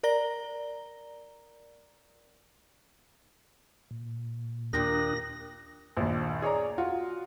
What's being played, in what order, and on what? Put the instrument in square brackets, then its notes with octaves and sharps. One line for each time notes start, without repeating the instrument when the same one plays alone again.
[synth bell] A#4 D5 A#5 A#6 G7
[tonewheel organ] A#2
[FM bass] D#2 [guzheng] A#2 G4 A#4 [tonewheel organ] D4 D#6 F#6 [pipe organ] A#6
[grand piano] A#1 D#2
G#4 C#5 D5 A#5
F4 F#4